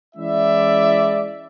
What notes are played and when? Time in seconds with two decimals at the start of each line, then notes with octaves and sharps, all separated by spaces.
0.16 E3 G#3 C#4 E4 D5 E5